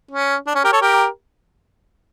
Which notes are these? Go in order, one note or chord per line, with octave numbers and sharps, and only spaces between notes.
C#4
D4
C#4
G4 A#4
A4 C#5
G4 A#4